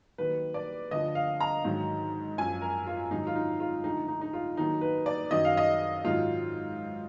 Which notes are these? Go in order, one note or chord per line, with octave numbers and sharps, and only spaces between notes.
D#2 D#3 F#3 B4
D5
D2 D3 F3 D#5
F5
A#5
G#2 D#3 F#3
F#2 F3 G#5
A#4
F4
G#2 D#3 F#3 D#4
F4
D#4
F4
D2 D3 F3 D#4
D#4
D#4
F4
D#2 D#3 F#3 D#4
B4
D5
F#2 D#3 F#3 D#5
F5
D#5
G#2 D#3 F#3 F4